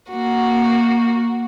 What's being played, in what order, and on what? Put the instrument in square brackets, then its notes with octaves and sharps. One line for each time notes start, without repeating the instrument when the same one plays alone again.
[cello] A#3 [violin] F#4